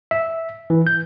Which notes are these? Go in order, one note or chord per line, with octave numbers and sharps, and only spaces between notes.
E5
E3
G6